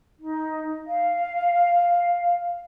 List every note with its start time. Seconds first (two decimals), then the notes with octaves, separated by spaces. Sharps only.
0.19 D#4
0.86 F5